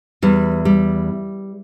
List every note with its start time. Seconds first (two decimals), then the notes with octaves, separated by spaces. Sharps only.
0.22 E2 G3
0.65 G3